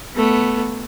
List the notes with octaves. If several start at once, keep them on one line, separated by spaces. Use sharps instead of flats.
A3 B3